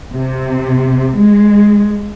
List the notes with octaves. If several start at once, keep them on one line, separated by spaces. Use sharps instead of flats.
C3
G#3